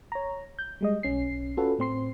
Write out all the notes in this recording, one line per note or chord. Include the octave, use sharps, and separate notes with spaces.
C#5 A#5
G6
G3 G#3 D#5
B1 C#4 C7
C#4 F4 F#4 A4 B4
A2 C4 C6 C7